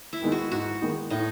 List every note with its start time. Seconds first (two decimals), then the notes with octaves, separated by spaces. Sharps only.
0.13 E4
0.22 D#3 G#3 B3 D#4
0.32 F#4
0.51 G#2 F#4
0.81 D#3 G#3 B3 D#4
1.10 A2 D#4